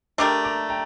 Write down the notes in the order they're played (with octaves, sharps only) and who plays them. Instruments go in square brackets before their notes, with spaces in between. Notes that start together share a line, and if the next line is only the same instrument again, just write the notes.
[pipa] A3 D4 G4 A#4 [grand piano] A#5 D6
[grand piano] A#5 D6
G5 A#5